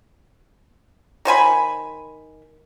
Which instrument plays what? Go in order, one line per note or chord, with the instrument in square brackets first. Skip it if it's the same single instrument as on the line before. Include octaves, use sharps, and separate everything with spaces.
[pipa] D#3 C5 G#5 B5